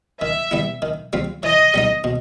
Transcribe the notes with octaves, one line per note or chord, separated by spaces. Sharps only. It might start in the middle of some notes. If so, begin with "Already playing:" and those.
D#3 E5
G3 B3 E4
D#3
G3 C4 F4
E3 D#5
G3 B3 D#4
B2